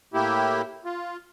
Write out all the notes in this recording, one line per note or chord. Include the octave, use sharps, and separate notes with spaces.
A2 A#3 E4 G4
F4